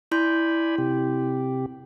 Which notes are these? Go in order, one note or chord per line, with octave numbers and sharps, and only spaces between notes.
E4 D5 G#5 B5 C6 G6
C3 G4